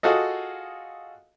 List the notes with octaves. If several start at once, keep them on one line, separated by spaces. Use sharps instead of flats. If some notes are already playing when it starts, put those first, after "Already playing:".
F4 F#4 G#4 A4 D#5